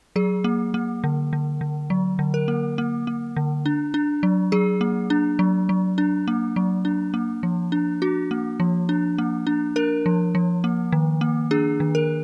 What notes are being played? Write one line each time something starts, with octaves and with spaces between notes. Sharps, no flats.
F#3 G#4
A#3
A#3
D3
D3
D3
F#3
D3
A#4
A#3
A#3
A#3
D3
D4
D4
F#3
F#3 G#4
A#3
D4
F#3
F#3
D4
A#3
F#3
D4
A#3
F3
D4
D4 F#4
A#3
F3
D4
A#3
D4
D4 A#4
F3
F3
A#3
D#3
A#3
D4 G#4
D#3
A#4